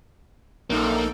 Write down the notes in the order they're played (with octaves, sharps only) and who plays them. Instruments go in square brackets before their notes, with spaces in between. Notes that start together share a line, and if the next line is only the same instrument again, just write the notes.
[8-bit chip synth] A#1 D#4 A4 [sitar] F#2 A#2 [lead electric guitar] A#3